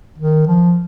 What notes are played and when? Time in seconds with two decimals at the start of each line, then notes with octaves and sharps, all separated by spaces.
0.18 D#3
0.47 F3